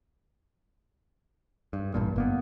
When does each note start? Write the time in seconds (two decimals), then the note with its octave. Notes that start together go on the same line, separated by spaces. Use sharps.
1.73 G2
1.94 A1 G2 A#2
2.16 G1 A#3 B3